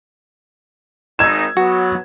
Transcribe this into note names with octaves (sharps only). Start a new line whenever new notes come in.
G#1 D#4 E6 G#6 E7
F#3 B3 F#4